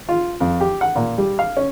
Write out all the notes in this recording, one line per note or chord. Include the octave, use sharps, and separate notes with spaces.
F4
F2
G4
F#5
A#2
G3
F5
C#4